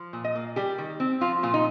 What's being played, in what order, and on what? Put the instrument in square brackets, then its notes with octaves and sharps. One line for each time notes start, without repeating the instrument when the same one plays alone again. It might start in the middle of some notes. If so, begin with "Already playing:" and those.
Already playing: [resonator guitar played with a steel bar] F3
A#2
D#5
A#3
G3 G4
D#3
C4
F3 F4
A#2 F4
D#4